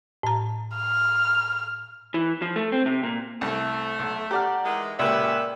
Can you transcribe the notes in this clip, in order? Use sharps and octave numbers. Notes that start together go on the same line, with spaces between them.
A2 A#5
F6
E3
F3
A3
C4
C3
A#2
C2 A3
B1
G4 D5 F#5 A#5 F6
D#3 E3 G#3
C#2 A#2 C#3 G4 A#4 B4 D5 E5